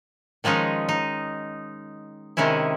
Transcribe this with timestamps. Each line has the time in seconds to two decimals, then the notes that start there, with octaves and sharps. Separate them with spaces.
0.44 D#3 F3 G#3 C#4 D#4
0.89 D#4
2.37 C3 D#3 G#3 C#4 E4